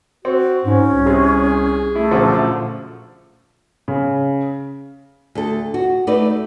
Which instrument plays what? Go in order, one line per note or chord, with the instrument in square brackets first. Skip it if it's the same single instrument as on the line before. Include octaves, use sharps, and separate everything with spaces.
[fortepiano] C4 [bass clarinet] F#4
[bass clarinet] G#2 [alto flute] C#4
[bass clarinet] C2
[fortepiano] C3 [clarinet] G#4
[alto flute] A3 [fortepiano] E4
[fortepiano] F#2 D3 F3 [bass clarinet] A#2
[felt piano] C#3
[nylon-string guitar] D2 A4
F#4
A3 D#4 B4 D5